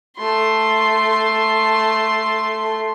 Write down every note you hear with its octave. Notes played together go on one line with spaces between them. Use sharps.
A3 C6